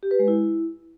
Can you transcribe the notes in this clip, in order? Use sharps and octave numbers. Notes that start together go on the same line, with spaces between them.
G4
B4
G#3
E4